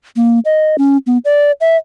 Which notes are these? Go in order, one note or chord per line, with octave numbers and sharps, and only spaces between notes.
A#3
D#5
C#4
B3
D5
E5